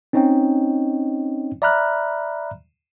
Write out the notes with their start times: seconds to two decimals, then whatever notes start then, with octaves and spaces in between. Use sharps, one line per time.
0.13 C4 C#4 D#4 C#5 D#5 G5
1.62 D5 E5 A#5 B5 F6 F#6